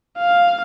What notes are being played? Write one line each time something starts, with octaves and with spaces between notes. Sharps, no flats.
F5